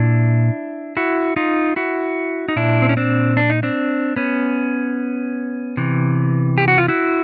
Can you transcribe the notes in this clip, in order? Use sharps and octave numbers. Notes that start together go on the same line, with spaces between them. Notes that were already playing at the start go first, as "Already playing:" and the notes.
Already playing: A#2 D4 E4
E4 F#4
D#4 F4
E4 F#4
D#4
A#2 D4 E4
C4
C#4
C4 D4
D4
D#4
C4 D4
B3 C#4
C3 E3
G4
F#4
F4
E4 F#4